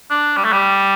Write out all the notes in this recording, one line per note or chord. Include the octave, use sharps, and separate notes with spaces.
D4
G3
A3
G3